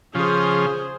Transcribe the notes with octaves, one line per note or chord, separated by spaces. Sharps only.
C#3 F3 G#4 C5